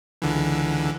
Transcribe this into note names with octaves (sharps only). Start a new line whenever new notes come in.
C#2 D3 E3